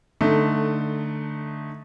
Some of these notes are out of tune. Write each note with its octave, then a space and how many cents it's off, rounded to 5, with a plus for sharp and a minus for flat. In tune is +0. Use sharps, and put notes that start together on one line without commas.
D3 +10 A3 +0 D#4 +0